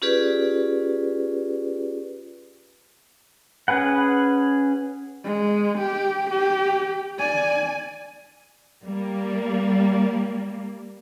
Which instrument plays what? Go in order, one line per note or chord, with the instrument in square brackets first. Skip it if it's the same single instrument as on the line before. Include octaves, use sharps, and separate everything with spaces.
[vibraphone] C#4 F4 G4 G#4 B4 D5
[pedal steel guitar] C#4 G#4 B4 F#5
[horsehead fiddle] G#3
G4
G4
D5 G#5
[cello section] G3 A#3